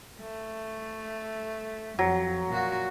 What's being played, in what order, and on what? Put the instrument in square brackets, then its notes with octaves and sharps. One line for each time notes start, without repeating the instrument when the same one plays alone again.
[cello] A3
[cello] F2 [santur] F#3
[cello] A#2 F#4